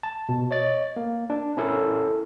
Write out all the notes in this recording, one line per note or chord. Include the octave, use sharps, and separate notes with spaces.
A5
B2
C#5 D#5 A6
A#3
D4
C#4 E4 A4 A#4